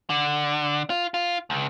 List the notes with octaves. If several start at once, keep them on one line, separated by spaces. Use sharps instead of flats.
D3
F4
F4
C#2